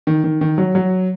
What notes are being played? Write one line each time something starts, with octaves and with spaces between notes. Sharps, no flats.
D#3
D#3
D#3
F#3
F#3